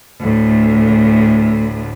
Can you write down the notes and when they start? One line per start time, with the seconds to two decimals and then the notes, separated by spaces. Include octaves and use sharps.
0.20 D2 A2